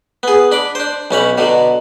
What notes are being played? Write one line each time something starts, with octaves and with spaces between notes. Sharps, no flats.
B3 G#4
D4 B5 D6
D4 C5
B1 C#4 C#5 B5
B2 D3 F#3